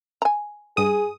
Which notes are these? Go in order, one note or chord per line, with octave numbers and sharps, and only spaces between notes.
G#5 A#5
G2 G#4 D#6